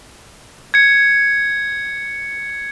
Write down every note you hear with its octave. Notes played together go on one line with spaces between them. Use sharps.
G#6 C#7